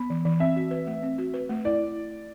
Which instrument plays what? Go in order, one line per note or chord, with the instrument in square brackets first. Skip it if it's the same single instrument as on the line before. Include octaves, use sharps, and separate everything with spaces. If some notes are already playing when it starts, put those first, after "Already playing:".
Already playing: [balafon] B3 [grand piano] B5
[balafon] E3
E3
[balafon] C4 [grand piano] E5
[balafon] F#4
B4
A3
C4
F#4
B4
A3
[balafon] E4 [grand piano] D5